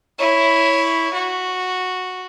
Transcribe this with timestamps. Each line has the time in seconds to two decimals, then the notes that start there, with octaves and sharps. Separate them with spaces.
0.19 E4 C#5
1.14 F#4